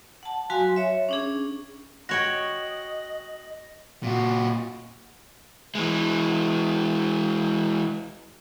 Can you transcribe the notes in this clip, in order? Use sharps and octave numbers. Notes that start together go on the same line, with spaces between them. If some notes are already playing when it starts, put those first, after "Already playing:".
F#5 A5
F#3 F#4 F5 G#5 C6
C#5 E5
C#4 D4 G#4
F#4 C#5 D#5 G5 A#6 F#7
A#2 F#4
E3 G#3